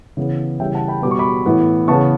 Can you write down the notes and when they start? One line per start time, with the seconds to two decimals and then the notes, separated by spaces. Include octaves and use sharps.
0.17 C#3 E3 B3
0.60 C#3 E3 G3 E5 G5
0.74 F#5 A5
0.88 G5 B5
1.02 B2 G3 B3 D6
1.11 C#6
1.19 B5 D6
1.46 A2 E3 B3
1.88 C#3 E3 B3 A5 C#6